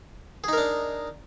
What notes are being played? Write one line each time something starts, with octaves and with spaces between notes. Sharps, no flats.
D4 D#4 G#4 A#4